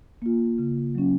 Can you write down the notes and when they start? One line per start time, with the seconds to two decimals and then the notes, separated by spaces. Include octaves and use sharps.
0.22 A#3 F4
0.58 C#3
0.95 F#3 C#4